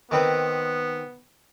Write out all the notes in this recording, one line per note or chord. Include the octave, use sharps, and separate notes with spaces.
D#3 B3 C4 B4